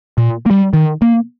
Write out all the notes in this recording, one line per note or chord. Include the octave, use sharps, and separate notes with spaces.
A#2
A#3
G3
D#3
A#3